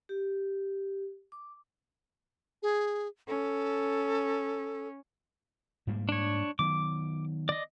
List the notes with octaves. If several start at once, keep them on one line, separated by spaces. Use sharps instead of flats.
G4
D6
G#4
C#4 A4
G#2 G3 A#3
D4 C#5
D#3 F#3 B3 D6
D5 D#5